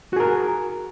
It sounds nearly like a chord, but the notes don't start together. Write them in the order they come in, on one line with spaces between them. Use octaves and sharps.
F#4 G#4 A#4